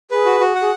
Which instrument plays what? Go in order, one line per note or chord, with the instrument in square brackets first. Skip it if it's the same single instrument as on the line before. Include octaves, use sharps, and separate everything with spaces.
[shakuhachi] G#4 [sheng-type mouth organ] B4
[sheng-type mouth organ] F#4
F#4
F#5
[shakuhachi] G#4